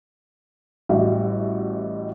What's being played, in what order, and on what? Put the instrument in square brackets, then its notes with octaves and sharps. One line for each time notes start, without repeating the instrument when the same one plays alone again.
[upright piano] A1 G3 F#4 D#5 E5